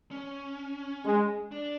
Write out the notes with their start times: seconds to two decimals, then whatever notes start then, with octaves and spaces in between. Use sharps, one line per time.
0.11 C#4
1.05 G#3
1.52 D4